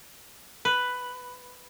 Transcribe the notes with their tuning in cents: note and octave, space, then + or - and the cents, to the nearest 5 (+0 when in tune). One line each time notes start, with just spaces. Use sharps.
B4 +5